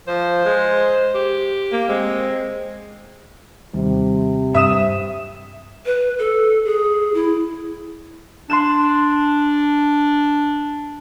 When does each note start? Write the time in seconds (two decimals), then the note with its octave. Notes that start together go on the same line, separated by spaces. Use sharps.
0.08 F3 C5
0.45 G#3
1.14 G4
1.72 A#3
1.89 G#3 C4
3.74 D#2 C3 D#3 G3
4.54 G2 E5 D#6 E7
5.86 B4
6.19 A4
6.65 G#4
7.14 E4
8.50 D4 C6 F#6 E7